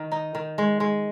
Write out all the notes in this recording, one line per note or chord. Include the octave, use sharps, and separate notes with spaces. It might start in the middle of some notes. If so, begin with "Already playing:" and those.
Already playing: D#3
D#4
D#3
G#3
G#3